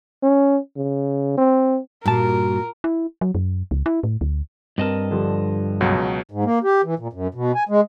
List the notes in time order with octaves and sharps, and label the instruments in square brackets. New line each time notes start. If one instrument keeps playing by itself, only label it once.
[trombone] C#4
C#3
C4
[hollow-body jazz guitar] G2 A5 [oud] A#2 [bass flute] F#4 [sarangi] A#4
[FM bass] E4
F#3
F#2
C#2
E4
A2
D2
[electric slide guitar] G2 D#5 A5 [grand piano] C4 A#4
[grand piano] D3 F3 G3
[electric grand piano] C#2 B2 F#3
[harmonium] G#2
A#3
G4
E3
A#2
F#2
B2
G#5
G#3